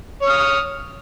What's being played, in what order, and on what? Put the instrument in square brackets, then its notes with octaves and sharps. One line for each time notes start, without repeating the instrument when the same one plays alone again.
[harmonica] C#5
F6
D#6